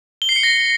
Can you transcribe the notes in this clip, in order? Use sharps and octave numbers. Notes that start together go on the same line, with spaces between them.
G7
C7
C#7
A#6